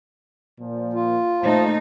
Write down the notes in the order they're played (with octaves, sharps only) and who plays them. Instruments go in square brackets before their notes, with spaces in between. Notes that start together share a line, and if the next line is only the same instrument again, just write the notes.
[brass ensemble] A#2 F3
[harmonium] F4
[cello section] A#2 A3 D#4 [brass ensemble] C5 A5